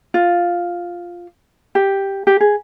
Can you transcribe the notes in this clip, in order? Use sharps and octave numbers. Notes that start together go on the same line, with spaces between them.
F4
G4
G4
G#4